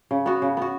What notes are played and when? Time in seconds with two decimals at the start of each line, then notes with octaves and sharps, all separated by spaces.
0.11 C#3
0.26 B3 F#4
0.42 C#3
0.57 B3 F#4